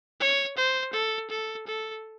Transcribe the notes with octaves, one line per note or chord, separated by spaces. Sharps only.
C#5
C5
A4
A4
A4